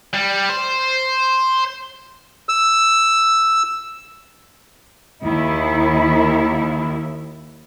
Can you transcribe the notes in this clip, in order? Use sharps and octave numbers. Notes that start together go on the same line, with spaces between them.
G3
C5
E6
D#2 D#3 E4